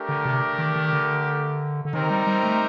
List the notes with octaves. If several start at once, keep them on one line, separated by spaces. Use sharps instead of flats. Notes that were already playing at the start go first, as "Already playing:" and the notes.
Already playing: A3 D4 G4 A#4
D3
C3
D#3
D#3
D3
D3
D#3 C4 D#4 G4 A#4
G3
G3
A3